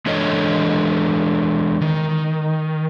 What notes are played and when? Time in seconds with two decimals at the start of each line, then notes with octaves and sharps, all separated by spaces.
0.06 E3 G#3 D4 A4 C#5 D#5
1.81 D#3